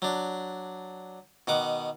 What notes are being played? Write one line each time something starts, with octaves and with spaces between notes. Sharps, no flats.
F#3 D4
B2 D#3 F#5 D6